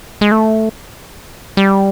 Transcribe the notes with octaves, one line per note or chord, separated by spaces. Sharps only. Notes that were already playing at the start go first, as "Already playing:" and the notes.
G#3
A3
G3